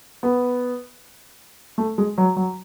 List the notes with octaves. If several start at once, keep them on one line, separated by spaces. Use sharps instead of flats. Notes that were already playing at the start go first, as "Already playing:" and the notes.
B3
A3
G#3
F#3
F#3